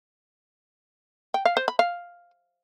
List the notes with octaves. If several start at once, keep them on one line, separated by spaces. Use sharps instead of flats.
G5
F5
C5
B5
F5